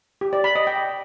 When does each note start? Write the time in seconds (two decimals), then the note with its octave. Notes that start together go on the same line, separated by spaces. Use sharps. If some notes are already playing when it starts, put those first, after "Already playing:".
0.21 G4
0.33 D5
0.44 B5
0.56 D#5
0.67 G5